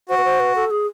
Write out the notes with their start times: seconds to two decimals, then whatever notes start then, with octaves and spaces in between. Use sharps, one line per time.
0.09 F#4 C5
0.17 B4
0.25 C5
0.40 B4
0.56 A4
0.71 G#4